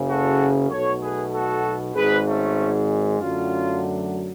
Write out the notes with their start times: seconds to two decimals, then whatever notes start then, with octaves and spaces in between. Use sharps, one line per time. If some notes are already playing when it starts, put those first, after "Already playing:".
Already playing: F#1 F#2 C#3
0.09 F#4 A4
0.71 B1 B2 A3 A4 C#5
1.02 G#4 B4
1.34 F#4 A4
1.96 G#1 G#2 G#3 G#4 B4
2.26 A3 C#4
3.20 F#2 D3 F#3 A3 C#4 F4